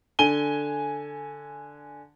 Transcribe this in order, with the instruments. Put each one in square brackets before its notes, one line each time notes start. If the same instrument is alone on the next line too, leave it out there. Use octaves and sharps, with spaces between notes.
[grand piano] D3 G#5 D#7 G7